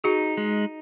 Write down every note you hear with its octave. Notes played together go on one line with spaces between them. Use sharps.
D#4 F#4 G#4
G#3